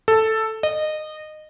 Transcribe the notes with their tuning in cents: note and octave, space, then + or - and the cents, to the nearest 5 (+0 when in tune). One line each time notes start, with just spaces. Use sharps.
A4 +5
D#5 -20